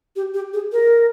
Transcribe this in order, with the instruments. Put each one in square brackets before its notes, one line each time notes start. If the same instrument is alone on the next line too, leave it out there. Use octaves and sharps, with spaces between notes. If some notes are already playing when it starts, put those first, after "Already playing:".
[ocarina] G4
G4
G#4
A#4